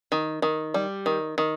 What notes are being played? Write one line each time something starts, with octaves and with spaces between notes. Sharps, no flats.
D#3
D#3
G3
D#3
D#3